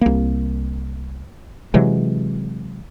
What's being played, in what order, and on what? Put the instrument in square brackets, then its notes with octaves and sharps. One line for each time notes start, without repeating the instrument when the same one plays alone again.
[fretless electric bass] C2 A#3
C3 E3 F#3 G#3